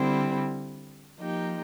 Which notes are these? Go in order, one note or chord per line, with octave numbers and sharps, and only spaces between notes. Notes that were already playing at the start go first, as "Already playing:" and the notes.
Already playing: D3 G3 C4 E4
F3 A#3 D#4 G4